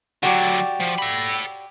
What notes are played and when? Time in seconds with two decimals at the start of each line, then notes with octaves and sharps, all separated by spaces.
0.23 D3 F#3 F#4 G4 D5
0.80 F3
0.98 A4 B5